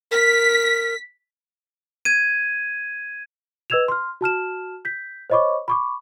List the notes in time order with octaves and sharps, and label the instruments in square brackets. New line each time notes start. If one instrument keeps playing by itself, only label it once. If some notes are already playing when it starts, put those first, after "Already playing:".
[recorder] A#4 [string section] B6
[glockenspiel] G#6 D#7
[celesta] B4 D#5 E6 G#6 E7 F7
C6 F6
F#4 A5 F6 E7
G6 B6
C5 C#5 D#5 B5 C#6 D6
B5 C#6 D6